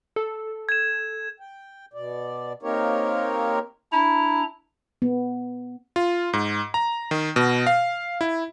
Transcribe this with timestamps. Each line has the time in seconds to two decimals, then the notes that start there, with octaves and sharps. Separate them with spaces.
0.16 A4
0.69 G#6 E7
1.40 G5
1.93 B2 D5
2.63 A#3 C4 D#4 G4 A#4 C#5
3.93 D4 E4 A#5
5.02 B3
5.96 F4
6.33 G#2
6.74 A#5
7.11 D#3
7.36 B2
7.67 F5
8.21 E4